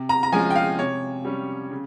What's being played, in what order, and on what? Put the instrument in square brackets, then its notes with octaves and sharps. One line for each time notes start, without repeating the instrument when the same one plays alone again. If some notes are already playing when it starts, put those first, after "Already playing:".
Already playing: [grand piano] C3
A#5
A#5
F3 G#3 C#4 G#5
G5
F5
C3 C#5
G3 C#4
C#3